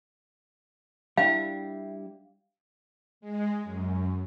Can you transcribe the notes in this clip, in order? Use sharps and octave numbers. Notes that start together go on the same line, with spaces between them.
G3 D4 E4 E5 F5 G5
G#3
F#2